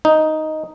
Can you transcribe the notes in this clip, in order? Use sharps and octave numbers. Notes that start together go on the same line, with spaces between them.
D#4